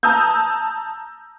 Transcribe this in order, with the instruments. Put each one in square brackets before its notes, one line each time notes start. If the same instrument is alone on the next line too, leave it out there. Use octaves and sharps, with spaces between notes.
[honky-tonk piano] A5 A#5 D#6 E6 G6